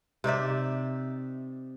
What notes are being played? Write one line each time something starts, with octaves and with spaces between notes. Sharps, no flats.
C3 D#4 D5 E5